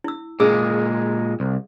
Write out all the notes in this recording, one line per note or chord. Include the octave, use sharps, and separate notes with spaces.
E4 E6
A#2 G#3 G#4 E6
C2